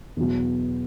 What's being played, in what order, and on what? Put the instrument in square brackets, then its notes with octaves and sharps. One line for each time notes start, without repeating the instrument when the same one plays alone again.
[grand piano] E2 B2 F#3